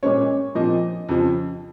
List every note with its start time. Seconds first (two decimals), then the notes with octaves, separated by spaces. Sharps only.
0.03 A#2 G#3 C#4 C#5
0.55 A#2 F3 C4 D#5
1.09 F2 C#3 F3